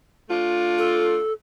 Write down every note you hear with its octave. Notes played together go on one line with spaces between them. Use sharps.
A3 D4 F4
A4